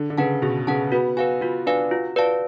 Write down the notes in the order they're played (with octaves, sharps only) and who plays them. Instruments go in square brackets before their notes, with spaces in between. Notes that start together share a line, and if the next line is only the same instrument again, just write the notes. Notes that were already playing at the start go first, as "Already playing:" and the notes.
Already playing: [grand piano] D3
D3
[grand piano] C#3 [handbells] B4 F#5 A5
[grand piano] B2 [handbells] G#4
[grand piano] C#3 [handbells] B4 F#5 A5
[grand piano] B3 [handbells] F#4
[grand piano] F#4 [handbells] B4 F5 G#5
[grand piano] F4 [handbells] F#4
[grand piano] D4 [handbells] B4 F5 G#5
[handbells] F4 [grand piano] F#4
[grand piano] F#4 [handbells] B4 D5 F5 A5